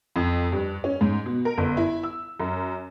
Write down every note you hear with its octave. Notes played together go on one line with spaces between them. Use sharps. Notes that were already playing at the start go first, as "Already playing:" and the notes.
F2
G2
C#4
G#2
B2
A#4
G1
E4
E6
F#2